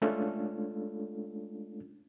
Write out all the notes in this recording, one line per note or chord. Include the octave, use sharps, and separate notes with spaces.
G#3 A3 C#4 D4 F4 A4